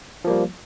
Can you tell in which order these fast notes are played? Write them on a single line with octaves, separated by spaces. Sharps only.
F3 A#3 G3